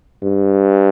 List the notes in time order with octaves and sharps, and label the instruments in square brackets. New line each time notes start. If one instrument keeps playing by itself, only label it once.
[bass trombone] G2